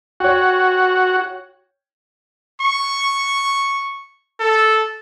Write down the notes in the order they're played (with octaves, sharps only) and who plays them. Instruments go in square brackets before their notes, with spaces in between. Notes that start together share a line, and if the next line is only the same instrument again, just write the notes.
[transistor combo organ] F#4 [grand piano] C#5 G5
[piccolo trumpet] C#6
A4